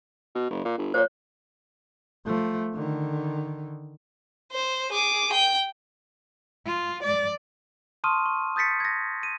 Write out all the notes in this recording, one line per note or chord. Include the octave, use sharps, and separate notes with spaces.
B2
F#1
A#2
G1
A#2 C5 C#5
F3 A3
D3 D#3
C5
G#4 D6
G5
F4
D5
A5 C6 C#6 D#6 F6 D#7
C#6
D#6 G6 A6 B6 C#7
G#6 A#6
D#7